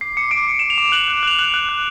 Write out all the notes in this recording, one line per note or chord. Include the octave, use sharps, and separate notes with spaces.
D6 C7
D6 C#7
D6 D7
D6
D6 E7
F7
D6
F#6 F#7
F#6
F#6 F7
F#6 F#7
F#6
F#6